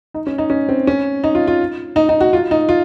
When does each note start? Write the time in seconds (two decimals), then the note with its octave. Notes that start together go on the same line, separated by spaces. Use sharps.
0.14 D#4
0.27 C#4
0.38 D#4
0.50 C#4
0.69 C4
0.87 C#4
1.24 D#4
1.35 F4
1.47 F4
1.96 D#4
2.09 D#4
2.21 F#4
2.33 F4
2.51 D#4
2.69 F4